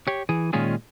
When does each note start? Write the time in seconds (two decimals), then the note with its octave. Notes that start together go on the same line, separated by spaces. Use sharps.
0.07 G4 C#5
0.29 E3 G#4
0.53 A#2 D#3 G#3 C#4 F4 G#4